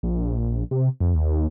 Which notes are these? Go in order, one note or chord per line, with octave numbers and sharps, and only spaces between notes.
A#1
C3
F2
D#2